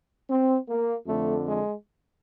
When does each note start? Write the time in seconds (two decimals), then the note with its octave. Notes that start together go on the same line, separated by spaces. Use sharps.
0.30 C4
0.68 A#3
1.07 F2 D3 A3
1.46 G#3